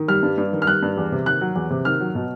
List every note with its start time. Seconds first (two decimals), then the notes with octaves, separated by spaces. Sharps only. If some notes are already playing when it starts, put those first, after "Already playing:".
Already playing: D#3
0.08 G3 F6
0.23 G2
0.38 G2
0.53 D#3
0.62 F6
0.67 G3 F#6
0.82 G2
0.97 E2
1.12 C3
1.26 D#3 F#6
1.41 F#3
1.56 E2
1.70 C3
1.85 D#3 F6
2.00 F#3
2.15 B2